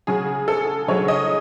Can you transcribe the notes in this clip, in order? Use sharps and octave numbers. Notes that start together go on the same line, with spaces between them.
C#3 F#3 G#4
A4
C#3 F#3 C#5
D#5